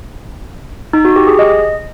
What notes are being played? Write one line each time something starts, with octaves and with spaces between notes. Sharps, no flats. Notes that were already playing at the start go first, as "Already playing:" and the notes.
D#4
F#4
G4
G#4
D#5